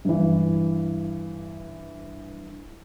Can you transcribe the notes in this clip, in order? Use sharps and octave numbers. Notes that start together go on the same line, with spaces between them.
G2 E3